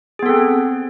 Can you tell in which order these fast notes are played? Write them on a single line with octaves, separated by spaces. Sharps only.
G#4 B3 A4 C4